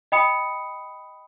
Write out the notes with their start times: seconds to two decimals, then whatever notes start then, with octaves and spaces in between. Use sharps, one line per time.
0.12 D#5 G5 B5 D#6 C#7